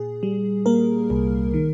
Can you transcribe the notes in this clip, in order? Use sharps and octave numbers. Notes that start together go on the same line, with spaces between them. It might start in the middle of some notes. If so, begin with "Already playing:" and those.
Already playing: A#2 G#4
G3
A#3 A#4
C2
D#3